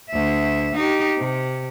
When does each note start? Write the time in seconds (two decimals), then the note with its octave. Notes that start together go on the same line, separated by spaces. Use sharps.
0.10 D2 E5
0.75 D#4 G4
1.18 C3